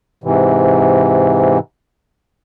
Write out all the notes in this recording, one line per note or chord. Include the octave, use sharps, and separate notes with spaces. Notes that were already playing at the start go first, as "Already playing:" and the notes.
G#2 C3 E3